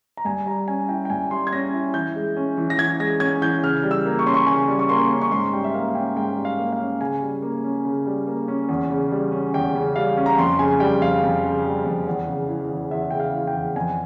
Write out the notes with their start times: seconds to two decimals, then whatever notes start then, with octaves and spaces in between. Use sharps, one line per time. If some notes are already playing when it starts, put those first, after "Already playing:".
0.17 A#5
0.25 G2 G#5
0.46 G3 A#5
0.68 C#4 G#5
0.89 E4 G5
1.05 G5
1.10 G2 G#5
1.31 G3 C6
1.47 G#6
1.53 C#4 A#6
1.74 E4
1.94 E3 G6
2.15 G#3
2.37 C#4
2.57 E3
2.70 A#6
2.78 E3 G#6
3.00 G#3 A#6
3.20 C#4 G#6
3.41 E3 G6
3.63 C#3 F6
3.84 G3
3.91 E6
4.06 A#3
4.19 C#6
4.26 C#4 C6
4.34 C#6
4.47 C#3 G#5
4.68 G3
4.79 C#6
4.89 A#3 C6
5.10 C#4
5.22 C#6
5.31 G#2 C6
5.53 G3 G5
5.64 E5
5.74 A#3 F5
5.95 C#4 G5
6.16 G#2 G5
6.37 G3
6.45 F5
6.58 A#3
6.73 F5
6.79 C#4
7.00 C#3 G#5
7.21 G3
7.42 A#3
7.64 C#4
7.85 C#3
8.06 G3
8.27 A#3
8.48 C#4
8.69 E2
8.90 C#3
9.11 G3
9.32 C#4
9.54 E2 G5
9.75 C#3
9.96 G3 F5
10.17 C#4
10.26 A#5
10.38 F2 C6
10.59 C#3 G#5
10.80 G3 G5
11.01 F2 F5
11.23 F2
11.44 C#3
11.65 G3
11.85 F2
12.07 E2
12.27 C#3
12.48 E3
12.70 E2
12.91 E2 E5
13.11 C#3 G5
13.20 F5
13.33 E3
13.48 G5
13.55 E2
13.76 F2 G#5